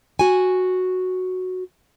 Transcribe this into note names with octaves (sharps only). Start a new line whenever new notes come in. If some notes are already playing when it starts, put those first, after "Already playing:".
F#4 G#5